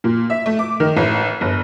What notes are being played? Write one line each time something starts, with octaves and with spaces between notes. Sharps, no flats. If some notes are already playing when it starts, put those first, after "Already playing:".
A#2
E5
A3
D6
D#3
A1
G1